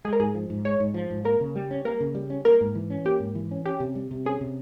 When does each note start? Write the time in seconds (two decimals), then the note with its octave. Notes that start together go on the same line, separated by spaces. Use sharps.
0.05 G#3 G#4
0.13 A#4
0.20 G#2 G#4
0.35 F3
0.50 G#2
0.65 G#3 C#5
0.80 G#2
0.94 F3
1.10 G#2
1.24 A#3 A#4
1.40 C#3
1.55 G3
1.71 C#4
1.85 A#3 A#4
2.00 C#3
2.15 G3
2.30 C#4
2.45 A#3 A#4
2.61 G#2
2.75 E3
2.90 C#4
3.05 A#3 G4
3.20 G#2
3.35 E3
3.51 C#4
3.65 C#4 G4
3.80 C3
3.95 G3
4.11 C3
4.25 C#4 G#4
4.41 C3